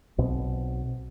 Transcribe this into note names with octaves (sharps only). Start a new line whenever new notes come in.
B1 B2 C4